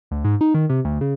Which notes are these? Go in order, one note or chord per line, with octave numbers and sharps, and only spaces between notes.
D2
G#2
D#4
D#3
C3
D2
C#3